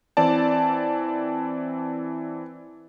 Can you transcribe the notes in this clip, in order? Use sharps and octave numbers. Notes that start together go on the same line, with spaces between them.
E3 C4 D5 A5